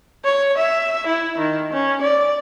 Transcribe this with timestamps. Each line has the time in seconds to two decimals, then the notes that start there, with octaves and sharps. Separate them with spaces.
0.25 C#5
0.57 E5
1.06 E4
1.38 D#3
1.72 C#4
2.01 D5